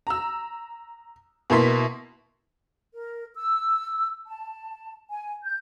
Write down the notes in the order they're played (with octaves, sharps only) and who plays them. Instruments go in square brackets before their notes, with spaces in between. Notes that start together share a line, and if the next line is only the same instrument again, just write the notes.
[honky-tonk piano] A#5 E6
B2 A#3 E4 C6 B6
[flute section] A#4
E6
A5
G#5
G6